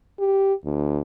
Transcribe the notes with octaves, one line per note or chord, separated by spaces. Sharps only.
G4
D2